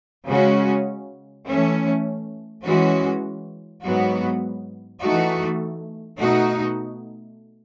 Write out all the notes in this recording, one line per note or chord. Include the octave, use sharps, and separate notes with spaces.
C#3 G#3 C#4 F#4
E3 A3 C#4
E3 G#3 C#4 F#4
G#2 F#3 B3 F#4
E3 A3 D#4 F#4
B2 A3 D#4 F#4